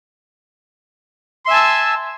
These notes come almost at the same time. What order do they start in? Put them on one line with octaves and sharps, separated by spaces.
C6 E5 G#5 A5 E6